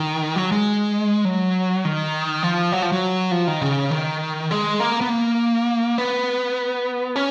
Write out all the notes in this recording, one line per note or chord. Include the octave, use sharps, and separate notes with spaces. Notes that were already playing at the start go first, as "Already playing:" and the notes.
Already playing: D#3
F#3
G#3
F#3
D#3
F3
F#3
F3
F#3
F3
D#3
C#3
D#3
G#3
A#3
B3
A#3
B3
C#4